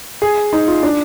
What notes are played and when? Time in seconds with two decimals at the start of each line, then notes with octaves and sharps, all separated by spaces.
0.22 G#4
0.53 D#4
0.68 F4
0.83 D4